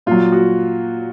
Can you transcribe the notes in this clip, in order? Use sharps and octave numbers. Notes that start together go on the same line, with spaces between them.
A#2 F#3 F4
F#4